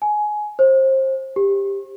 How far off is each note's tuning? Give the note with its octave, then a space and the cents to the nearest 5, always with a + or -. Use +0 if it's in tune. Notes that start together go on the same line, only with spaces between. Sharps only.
G#5 +15
C5 +30
G4 +15